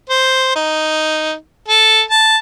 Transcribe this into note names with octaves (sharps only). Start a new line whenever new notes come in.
C5
D#4
A4
A5